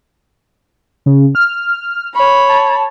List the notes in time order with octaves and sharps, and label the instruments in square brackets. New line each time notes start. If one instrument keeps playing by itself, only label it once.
[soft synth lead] C#3
F6
[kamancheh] C#5 B5
[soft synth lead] A5